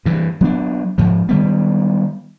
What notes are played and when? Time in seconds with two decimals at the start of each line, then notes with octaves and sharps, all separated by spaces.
0.05 G2 E3
0.41 F#3 B3 D4
0.98 G#2 F3
1.29 D#3 G3 B3